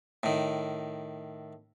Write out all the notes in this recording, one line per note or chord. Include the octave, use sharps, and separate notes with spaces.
A2 D#3